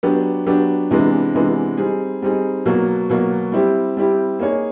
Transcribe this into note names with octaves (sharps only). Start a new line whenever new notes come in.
F#3 B3 D4 G4
F#3 B3 D4 G4
C3 E3 G#3 B3 D4
C3 E3 G#3 B3 D4
G3 C4 D#4 G#4
G3 C4 D#4 G#4
B2 F#3 A#3
B2 F#3 A#3
G3 C4 E4 G4
G3 C4 E4 G4
A#3 D#4 G#4 C#5